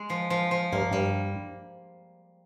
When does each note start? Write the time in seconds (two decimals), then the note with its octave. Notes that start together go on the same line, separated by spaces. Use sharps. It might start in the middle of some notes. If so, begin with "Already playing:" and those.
Already playing: G#3
0.10 F3
0.30 F3
0.51 F3
0.73 G2 A#3
0.91 G2 G3